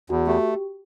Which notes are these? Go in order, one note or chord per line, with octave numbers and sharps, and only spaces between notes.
E2 F#4
A3 G4